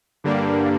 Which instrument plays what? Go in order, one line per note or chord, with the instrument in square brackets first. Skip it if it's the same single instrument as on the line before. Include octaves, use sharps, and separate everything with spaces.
[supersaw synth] G2 D3 G3 A#3 D4